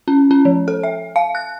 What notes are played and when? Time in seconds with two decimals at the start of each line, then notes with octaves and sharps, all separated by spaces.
0.08 C#4
0.31 C#4
0.45 F3
0.68 A4
0.83 E5
1.16 F5
1.35 F#6